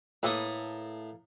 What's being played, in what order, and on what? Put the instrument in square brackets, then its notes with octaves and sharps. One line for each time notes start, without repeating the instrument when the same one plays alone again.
[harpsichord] A2 D#6 [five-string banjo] A#3 A4 B4